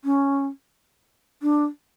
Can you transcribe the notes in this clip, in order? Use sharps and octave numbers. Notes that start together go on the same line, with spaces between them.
C#4
D4